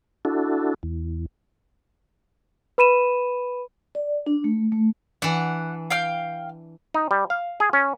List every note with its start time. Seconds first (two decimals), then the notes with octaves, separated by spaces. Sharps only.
0.25 D4 E4 F#4 A4
0.83 E2
2.78 B4 B5 D#7 E7
3.95 D5
4.27 D4
4.44 A3
4.72 A3
5.22 E3 D4 F#5
5.90 F5 G5 F6
6.94 D#4
7.11 G3
7.30 F5
7.60 G#4
7.73 C#4